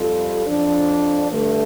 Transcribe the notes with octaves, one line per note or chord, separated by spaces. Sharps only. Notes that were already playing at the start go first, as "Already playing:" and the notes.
Already playing: F2 C3 G3 F4 A4
F2 F3 D4
G2 D3 A3